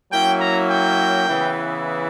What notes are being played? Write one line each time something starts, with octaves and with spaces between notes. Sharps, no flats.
F#3 A#3 C#4 E4 G5
A#5
G5
C#3 E3 B3 E4